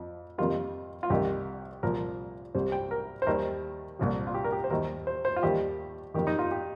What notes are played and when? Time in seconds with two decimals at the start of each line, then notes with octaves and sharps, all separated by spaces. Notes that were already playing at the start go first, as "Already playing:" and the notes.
Already playing: F2 F3
0.38 F2 C3 D#3 G3 A#3 F4
1.03 F4
1.10 C2 C3 D#3 G4
1.83 C2 A#2 F3 A#3 A#4
2.55 C2 C3 G3 C5
2.72 G5
2.91 A#4
3.22 C5
3.27 D#2 D#3 G3 A#4
3.99 C2 A#2 F3
4.27 F4
4.34 G4
4.44 A#4
4.52 G4
4.64 C5
4.70 D#2 D#3 G3 A#4
5.07 C5
5.25 C5
5.36 F4
5.43 D#2 D#3 G3 G4
6.14 F2 C3 D#3 G4
6.27 D#4
6.39 F4
6.51 G4